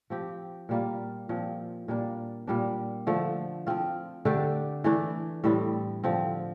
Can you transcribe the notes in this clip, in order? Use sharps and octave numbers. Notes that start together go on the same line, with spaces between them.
F3 C4 G4
A#2 G3 A#3 F4
A#2 F3 C4
A#2 G3 A#3 D4
A#2 G3 D4
D3 F3 A3
F3 C4 F4
D3 A3 D4 G4
E3 A3 D4
A2 G3 C4
D3 F3 C4